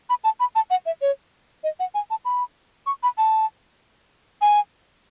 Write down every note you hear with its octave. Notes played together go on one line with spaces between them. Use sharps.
B5
A5
B5
A5
F#5
E5
C#5
D#5
F#5
G#5
A5
B5
C#6
B5
A5
G#5